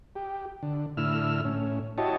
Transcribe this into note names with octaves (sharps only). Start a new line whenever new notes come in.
G4
D3
A2 D3 E4 E6 F6
A2 C#4
E4 F#4 G4 C#5 D#5 A5